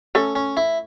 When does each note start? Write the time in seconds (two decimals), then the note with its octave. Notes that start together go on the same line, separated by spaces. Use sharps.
0.15 A3 C#4 A4
0.35 C#4
0.57 E4